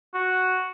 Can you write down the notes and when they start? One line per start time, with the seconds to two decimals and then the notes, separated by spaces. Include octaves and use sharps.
0.14 F#4